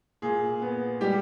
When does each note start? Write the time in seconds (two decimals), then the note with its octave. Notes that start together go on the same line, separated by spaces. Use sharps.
0.22 A#2 G#4
0.62 B3
1.01 G3 G4